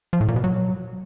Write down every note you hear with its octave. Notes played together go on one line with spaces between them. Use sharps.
F3
A2
A#2
B2
F#3